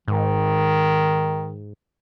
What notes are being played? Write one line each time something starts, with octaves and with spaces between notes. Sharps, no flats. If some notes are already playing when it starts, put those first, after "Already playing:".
G#2 D#3